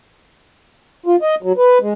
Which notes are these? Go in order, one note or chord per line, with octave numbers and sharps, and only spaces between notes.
F4
D#5
F#3
B4
G#3